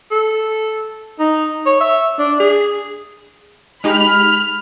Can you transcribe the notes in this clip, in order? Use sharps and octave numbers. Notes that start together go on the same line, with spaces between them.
A4
D#4
C#5
E5
D4
G#4
G#3 D#4 G4 B5 F6